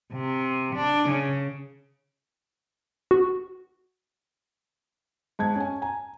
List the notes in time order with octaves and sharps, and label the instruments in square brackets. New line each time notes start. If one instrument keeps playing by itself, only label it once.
[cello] C3
D4
C#3
[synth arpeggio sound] F#4
[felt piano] G#2 G#6 [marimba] A5
[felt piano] C#4 G#5
[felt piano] G#5 [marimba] A#5